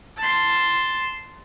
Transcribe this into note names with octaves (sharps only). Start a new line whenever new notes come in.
A5 C6